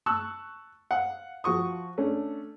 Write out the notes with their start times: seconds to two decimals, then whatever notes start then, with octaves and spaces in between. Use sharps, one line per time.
0.06 A5 C#6 E6 F#6
0.91 F5 F#5
1.44 F3 F#4 C#6 D#6
1.98 A3 C#4 D4 A4